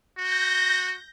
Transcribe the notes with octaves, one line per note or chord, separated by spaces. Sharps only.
F#4 G6 A#6